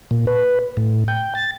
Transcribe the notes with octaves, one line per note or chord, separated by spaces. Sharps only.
A#2
B4
A2
G5
A6